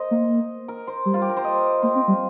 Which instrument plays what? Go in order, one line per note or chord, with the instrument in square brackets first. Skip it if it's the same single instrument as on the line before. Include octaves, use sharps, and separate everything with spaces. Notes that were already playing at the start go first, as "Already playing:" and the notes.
Already playing: [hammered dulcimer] A#4 C5 D#5
[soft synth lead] A#3
[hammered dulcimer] A#4
C5
[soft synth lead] G3
[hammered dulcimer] F4
G4
A#4
C5
D#5
[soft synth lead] A#3 [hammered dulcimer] C5
[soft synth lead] C4
G3